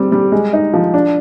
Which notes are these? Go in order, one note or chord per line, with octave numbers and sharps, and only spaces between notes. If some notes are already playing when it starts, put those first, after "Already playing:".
Already playing: G3 C4
G3
G#3
D#4
F3
D4